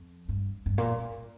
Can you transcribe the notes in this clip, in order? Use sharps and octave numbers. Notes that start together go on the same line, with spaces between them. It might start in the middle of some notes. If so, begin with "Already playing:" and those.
Already playing: F2
G2
G2
A#2